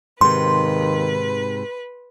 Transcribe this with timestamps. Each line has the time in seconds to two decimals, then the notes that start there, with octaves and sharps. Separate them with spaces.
0.21 G#2 C3 D#3 B4 C6